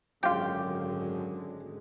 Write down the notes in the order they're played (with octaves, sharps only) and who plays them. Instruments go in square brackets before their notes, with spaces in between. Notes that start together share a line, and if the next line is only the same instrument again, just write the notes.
[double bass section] G#1 D3 G#3 [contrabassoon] F#2 [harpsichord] F4 G5 [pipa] G4